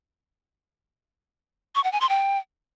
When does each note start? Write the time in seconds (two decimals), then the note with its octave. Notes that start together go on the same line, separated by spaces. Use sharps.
1.75 C#6
1.84 F#5
1.92 G#5
2.01 C6
2.09 G5